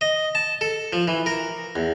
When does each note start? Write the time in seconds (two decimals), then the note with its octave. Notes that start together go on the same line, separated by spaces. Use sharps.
0.01 D#5
0.35 A5
0.61 A4
0.93 F3
1.08 E3
1.26 A#4
1.76 E2